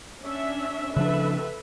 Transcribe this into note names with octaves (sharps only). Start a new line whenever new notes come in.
C#4 D4 E5
C#3 F3 D4 A4 B4 E5